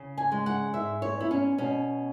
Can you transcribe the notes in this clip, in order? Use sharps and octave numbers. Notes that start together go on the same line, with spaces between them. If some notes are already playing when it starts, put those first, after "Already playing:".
Already playing: C#3
G#5
G#3
F#5
G#2 E5
C#5
B3 E4
C#4
B2 C#4